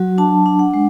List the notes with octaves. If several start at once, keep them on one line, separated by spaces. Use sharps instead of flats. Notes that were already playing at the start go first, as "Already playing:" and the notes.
Already playing: F#3 F#4
D4 A5
D4
F#5
G#3